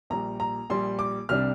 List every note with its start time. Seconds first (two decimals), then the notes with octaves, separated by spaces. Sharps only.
0.10 A#1 A#2 G3 A#5
0.40 A#5
0.70 A#1 A#2 G3 C6
0.99 D6
1.29 C2 C3 G3 D4 F6